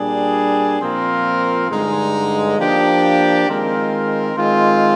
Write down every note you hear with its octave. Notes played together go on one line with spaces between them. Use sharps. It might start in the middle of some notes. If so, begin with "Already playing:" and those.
Already playing: A#2 G3 D4 G#4
A#2 F3 C4 F4 A#4
G2 D3 G#3 D#4
F3 A#3 D4 G4
D#3 G#3 C4 F4 A#4
D#3 G#3 C4 F4